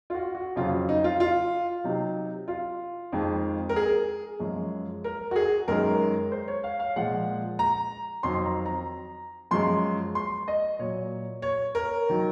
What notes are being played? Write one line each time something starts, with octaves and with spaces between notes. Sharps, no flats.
F4
F#4
F#4
F2 C#3 F#3 F4
D#4
F4
F4
C3 F#3 D#4
F4
F2 D#3 G#3
A#4
G#4
F#2 F3 G#3
A#4
F#4
G#4
F#2 D#3 G#3 A#4
C5
C#5
F5
F5
A#2 F3 G#3 F#5
A#5
F2 D#3 F#3 C6
A#5
A#5
F#2 F3 G#3 C6
C6
D#5
A#2 F#3 C#5
C#5
A#4
D#3 F#3